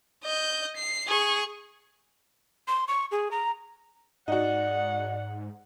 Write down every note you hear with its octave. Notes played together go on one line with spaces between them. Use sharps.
D#5 G6
C7
G#4 C#6
C6
C#6
G#4
A#5
G#2 D#4 F#4 D5 F#5